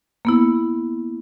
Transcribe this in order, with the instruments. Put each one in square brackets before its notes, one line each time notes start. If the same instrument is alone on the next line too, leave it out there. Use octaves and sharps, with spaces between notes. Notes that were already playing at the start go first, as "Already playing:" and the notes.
[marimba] A#3 B3 E4